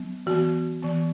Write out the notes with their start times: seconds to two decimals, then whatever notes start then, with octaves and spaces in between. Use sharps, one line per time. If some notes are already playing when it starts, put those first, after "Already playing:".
Already playing: F#3 B3
0.26 E3 B3 F#4
0.82 E3 B3